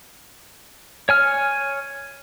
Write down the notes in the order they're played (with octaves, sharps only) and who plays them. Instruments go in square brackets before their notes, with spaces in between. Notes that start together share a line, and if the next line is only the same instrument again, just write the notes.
[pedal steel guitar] C#5 G#5 F6